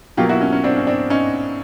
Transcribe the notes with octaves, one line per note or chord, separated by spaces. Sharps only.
B2 F#3 A#3 F4 G4
E4 F#4
C#4
C#4
C4 D4
C#4
C4 D4
C#4 D#4